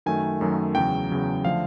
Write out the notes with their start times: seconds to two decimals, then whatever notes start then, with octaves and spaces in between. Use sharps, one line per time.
0.06 F#2 D#3 F#3 A3 G#5
0.41 F#2 D#3 F#3 A3
0.75 E2 C#3 F#3 G5
1.10 E2 C#3 F#3
1.44 D3 F3 A3 F5